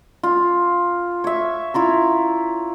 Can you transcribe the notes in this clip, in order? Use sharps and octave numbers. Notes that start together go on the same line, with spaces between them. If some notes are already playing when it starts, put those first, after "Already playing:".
F4
C#5 E5
E4 F4 A#5